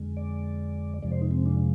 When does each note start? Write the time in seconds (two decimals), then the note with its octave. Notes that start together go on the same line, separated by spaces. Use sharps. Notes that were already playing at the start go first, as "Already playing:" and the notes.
Already playing: F2 D3 G#3
0.17 D5
1.02 F2 C3 F3 G#3 D5
1.12 C5
1.22 D#4
1.31 C4
1.46 D4